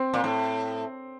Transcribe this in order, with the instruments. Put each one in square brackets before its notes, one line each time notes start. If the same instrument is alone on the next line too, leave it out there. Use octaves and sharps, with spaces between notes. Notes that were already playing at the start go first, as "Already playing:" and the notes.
Already playing: [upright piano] C4
[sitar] A#2
A2